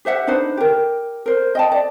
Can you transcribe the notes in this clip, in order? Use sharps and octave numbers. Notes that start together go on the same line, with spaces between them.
G4 C5 E5 F#5
D4 D#4 B4 C5
G4 A#4
A#4 C5
D#5 G5 A5
D5